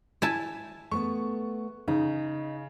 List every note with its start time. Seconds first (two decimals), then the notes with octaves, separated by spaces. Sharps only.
0.22 E4 G#5 A5
0.92 A3 B3 C#6
1.88 C#3 D#4